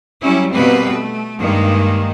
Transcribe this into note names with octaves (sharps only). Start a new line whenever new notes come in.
F#3 G3 C#4 E4
B2 G3 A#3 C4 B4
A3
G2 D#3 G#3 A#3